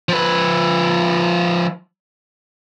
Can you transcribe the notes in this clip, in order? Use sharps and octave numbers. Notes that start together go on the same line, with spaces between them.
F3 B4